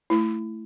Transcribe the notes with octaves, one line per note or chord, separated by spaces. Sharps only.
A3 E4